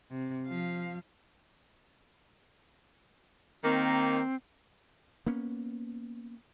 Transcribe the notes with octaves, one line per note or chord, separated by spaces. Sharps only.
C3
F3 F5
D#3 A#3 C4
A#3 B3 C#4